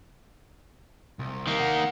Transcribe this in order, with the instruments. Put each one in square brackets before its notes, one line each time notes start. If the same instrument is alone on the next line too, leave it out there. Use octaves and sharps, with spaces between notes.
[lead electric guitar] C2
[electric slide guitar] D#3 A#3
[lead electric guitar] F#5